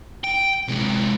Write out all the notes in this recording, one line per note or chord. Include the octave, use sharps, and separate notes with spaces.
G5
C3 G#3